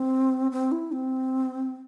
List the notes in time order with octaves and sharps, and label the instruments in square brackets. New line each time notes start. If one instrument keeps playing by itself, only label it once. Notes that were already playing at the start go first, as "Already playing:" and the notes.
Already playing: [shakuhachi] C4
C4
E4
C4